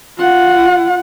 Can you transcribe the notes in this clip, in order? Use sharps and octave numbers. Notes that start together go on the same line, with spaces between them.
F4 F#5